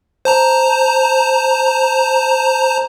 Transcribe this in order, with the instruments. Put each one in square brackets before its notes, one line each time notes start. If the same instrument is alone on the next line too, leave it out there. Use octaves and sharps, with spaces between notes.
[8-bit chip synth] C5 A5 A#5